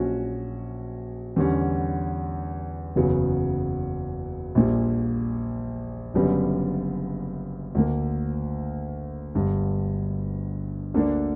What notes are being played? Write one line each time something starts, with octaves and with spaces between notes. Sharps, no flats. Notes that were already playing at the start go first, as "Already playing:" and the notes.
Already playing: A#1 A#2 F#3 C#4 F#4
E2 D3 G3 C#4
F#1 E2 C#3 F#3 B3
A#1 A#2 G3
F#1 F#2 D3 G3 B3
D2 D3 A#3
G1 G2 D3
D2 D3 A#3 D4